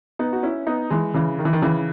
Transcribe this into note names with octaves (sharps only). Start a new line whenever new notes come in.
B3 D#4
F#4
C#4 E4
B3 D#4
E3 G#3
C#3 E3
D#3
E3
D#3
C#3 E3